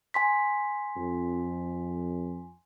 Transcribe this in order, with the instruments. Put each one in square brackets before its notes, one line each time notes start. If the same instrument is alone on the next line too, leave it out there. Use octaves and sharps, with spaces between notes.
[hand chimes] G#5 C6 B6
[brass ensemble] F2